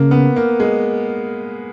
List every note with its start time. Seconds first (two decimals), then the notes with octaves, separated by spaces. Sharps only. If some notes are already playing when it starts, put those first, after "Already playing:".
Already playing: C#3 A#3
0.11 B3
0.36 A#3
0.60 G#3